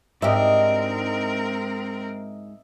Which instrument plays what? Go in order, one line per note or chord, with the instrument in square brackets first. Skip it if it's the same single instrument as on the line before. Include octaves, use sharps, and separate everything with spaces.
[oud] G#2 D4 G4 [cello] C4 A#4 [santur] D#5 E5